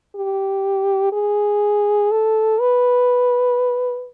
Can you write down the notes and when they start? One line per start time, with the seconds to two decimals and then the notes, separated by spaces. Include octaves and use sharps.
0.16 G4
1.13 G#4
2.11 A4
2.60 B4